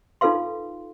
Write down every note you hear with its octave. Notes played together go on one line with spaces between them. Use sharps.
D#4 F4 A4 B4 F5 C6